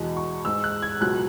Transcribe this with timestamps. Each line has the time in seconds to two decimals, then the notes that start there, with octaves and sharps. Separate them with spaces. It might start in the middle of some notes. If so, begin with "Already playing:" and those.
Already playing: E2 B2 G#3
0.17 C#6
0.44 G#2 G#3 E6
0.64 F#6
0.82 G#6
1.00 C#2 B2 F#3 F#6